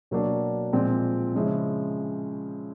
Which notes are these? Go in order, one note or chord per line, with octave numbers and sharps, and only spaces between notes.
B2 F#3 A#3 D4 F#4
A#2 F3 G#3 C4
C#3 F3 G#3 C#4 E4